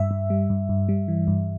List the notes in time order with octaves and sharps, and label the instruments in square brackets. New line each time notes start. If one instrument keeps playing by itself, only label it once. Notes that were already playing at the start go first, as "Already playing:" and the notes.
Already playing: [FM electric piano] G2 E5
G2
G3
G2
G2
G3
E3
G2